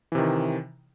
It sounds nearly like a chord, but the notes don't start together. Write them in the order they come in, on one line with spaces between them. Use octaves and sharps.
E3 C3 D#3